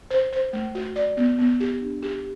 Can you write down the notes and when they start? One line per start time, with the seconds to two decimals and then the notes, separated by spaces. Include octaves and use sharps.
0.11 C5
0.33 C5
0.53 A3
0.75 F#4
0.96 D5
1.17 B3
1.38 B3
1.60 G4
1.81 D4
2.02 G4